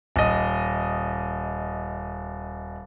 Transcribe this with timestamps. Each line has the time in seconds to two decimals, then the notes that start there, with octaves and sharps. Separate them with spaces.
0.16 D#1 D#5